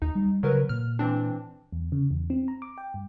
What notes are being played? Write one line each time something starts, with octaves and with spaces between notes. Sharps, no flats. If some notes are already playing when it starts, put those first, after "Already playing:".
D#2 D#4
G3
C#3 F#3 A#4 B4
A#2 F6
E3 C4 D4
E2
C#3
E2
C4
A#5
D6
G5
G2